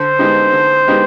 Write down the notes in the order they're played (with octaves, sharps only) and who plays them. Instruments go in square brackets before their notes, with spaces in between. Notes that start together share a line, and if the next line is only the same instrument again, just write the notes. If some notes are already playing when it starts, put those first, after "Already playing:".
Already playing: [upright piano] D3 [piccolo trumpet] C5
[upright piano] G#3 B3 D#4 G4
D3
G#3 B3 D#4 G4